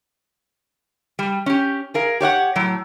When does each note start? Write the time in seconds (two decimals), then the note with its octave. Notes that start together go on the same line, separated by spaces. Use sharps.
1.19 G3
1.46 C#4 G4
1.94 G#4 A#4 F5
2.20 G4 C#5 F5 F#5
2.56 A2 F#3